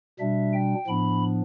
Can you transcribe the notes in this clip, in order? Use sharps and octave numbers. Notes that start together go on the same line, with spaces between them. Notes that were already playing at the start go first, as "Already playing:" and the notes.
B2 G3 D4 E5
G5
A2 F3 B3 D4 B5